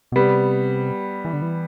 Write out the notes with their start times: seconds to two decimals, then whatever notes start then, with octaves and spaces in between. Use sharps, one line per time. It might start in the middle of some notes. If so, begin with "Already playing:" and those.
0.12 B2
0.15 C3 G3 B3
1.25 E3
1.33 D3
1.42 E3